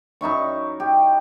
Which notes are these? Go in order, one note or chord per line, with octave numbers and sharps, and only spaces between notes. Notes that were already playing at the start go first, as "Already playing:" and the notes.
F#2 D#4 E4 C#6
G4